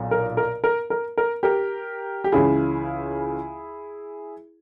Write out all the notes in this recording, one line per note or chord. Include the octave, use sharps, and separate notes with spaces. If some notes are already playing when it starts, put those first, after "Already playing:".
Already playing: B1 A#2
A#4
A#4
A#4
A#4
A#4
G4 A#4
G4
C#2 C#3 E3 E4 G#4